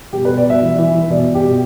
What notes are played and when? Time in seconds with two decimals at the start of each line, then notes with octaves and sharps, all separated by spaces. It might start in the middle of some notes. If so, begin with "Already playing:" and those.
0.13 B2 G4
0.25 B4
0.29 B2
0.37 D5
0.45 B2 E5
0.62 E3
0.78 E3
0.94 E3
1.10 B2 D5
1.27 B2
1.35 G4
1.43 B2